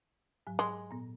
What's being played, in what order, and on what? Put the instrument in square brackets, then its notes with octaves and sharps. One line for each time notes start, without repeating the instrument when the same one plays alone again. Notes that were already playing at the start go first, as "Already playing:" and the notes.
[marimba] G#2 F#3
[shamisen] G#3
[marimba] A#2 B3